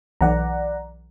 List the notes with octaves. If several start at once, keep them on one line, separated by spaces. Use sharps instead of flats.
B1 E3 D5 F#5 A#5